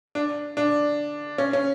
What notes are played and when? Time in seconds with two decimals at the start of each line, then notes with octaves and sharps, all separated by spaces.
0.15 D4
0.57 D4
1.38 C#4
1.53 C#4